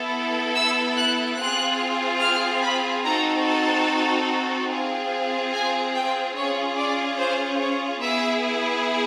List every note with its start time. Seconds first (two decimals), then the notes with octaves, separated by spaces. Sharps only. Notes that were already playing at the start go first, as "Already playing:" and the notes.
Already playing: B3 E4 A4
0.55 E6
0.97 F#6
1.38 C4 F4 G#4 F#6
2.21 F6
2.62 B5
3.04 C4 D#4 F#4 A4 A#5
3.45 A5
4.70 C4 F4 G#4
5.53 G#5
5.94 G5
6.36 C#4 F4 G#4 C#5
6.78 D5
7.19 C5
7.60 C#5
8.02 B3 E4 G#4 E5